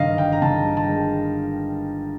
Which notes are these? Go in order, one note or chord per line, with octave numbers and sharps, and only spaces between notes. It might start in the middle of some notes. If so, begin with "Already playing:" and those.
Already playing: G2 D#3 D#5 F5
G1 G5
A#5
D#3 A5
G1
A5
G#3